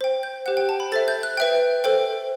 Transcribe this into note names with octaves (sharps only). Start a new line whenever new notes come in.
C5 G5
G6
G4 C5 F#5 F#6
G5
A5
B5
A4 C5 E5 A6
G6
F#6
B4 E5 G5
A4 C5 G5